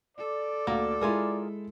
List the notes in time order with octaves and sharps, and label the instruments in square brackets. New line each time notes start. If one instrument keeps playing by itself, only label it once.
[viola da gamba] A4 [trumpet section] D5
[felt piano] D2 F5 [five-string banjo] A#3
[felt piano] G#3 E4 [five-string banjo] F4 G#4 A#4